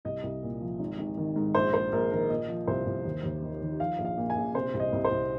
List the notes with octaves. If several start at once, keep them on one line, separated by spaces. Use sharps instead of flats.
C2 D#5
C2
A#2
F3
G#1
G#1
D#3
G#2
A#1 C5
A#1 C5
A#1 A#4
D#3 A#4
A#2 D#5
F3
C2 C5
C2
D#2
D#2
D#3
D#3
F3 F5
A#1
F5
A#2
G#5
A#1
C3 C5
C2
D#5
C2
C5
C2